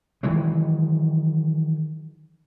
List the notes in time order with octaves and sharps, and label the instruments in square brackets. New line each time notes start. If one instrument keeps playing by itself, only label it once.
[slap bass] D#3 E3 F#3 G#3